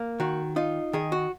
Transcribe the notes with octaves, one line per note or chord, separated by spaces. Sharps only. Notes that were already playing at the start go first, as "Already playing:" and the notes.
Already playing: A#3
D#3 F#4
D#4 F4
D#3 G#4
F#4